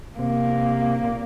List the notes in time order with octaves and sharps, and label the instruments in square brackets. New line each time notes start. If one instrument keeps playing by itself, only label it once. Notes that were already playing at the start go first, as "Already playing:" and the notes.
[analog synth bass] C3 [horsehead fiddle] A#3
[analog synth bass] A#2